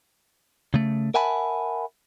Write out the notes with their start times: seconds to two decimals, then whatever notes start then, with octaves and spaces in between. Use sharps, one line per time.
0.74 C#3 A3
1.14 A#4 E5 F#5 G#5 A5 B5